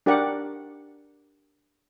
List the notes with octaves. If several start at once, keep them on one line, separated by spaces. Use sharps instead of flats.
D4 G4 A#4 D5 F#5 D6